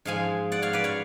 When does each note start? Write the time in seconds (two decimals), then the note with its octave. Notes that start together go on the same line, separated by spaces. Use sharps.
0.05 G#2 F3 G#3 F5 G#5
0.52 D5 F#5
0.62 C#5 F5
0.73 B4 D5
0.84 C#5 F5